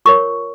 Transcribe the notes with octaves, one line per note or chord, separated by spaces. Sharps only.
F4 A#4 C#5 C#6